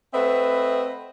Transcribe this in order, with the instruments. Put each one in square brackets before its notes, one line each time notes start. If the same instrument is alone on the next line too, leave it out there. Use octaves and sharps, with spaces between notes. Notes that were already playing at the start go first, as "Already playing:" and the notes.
[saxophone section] A3 C4 B4 D#5 E5 F#5